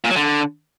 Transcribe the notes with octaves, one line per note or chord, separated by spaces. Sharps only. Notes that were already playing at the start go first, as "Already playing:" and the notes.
A#2
F#3
D3